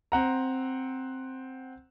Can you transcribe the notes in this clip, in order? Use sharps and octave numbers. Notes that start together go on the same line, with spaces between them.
C4 F#5 A#5